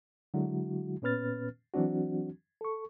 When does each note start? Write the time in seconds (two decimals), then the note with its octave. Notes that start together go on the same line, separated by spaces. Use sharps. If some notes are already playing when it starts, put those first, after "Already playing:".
0.34 D3 F#3 G#3 E4 F#4
1.02 A#2 B3 C#4 B4 F6 A6
1.74 E3 F#3 C4 D4 F#4
2.61 A4 C#6